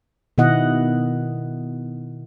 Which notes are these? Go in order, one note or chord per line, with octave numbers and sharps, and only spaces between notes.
B2 D#3 B3 E4 D#5 F#5